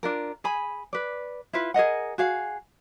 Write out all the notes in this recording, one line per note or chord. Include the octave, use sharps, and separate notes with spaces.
D4 F4 A#4
G#4 G#5 B5
B4 D5
E4 F4 B4
G#4 A#4 D#5 F#5
F#4 G#4 F5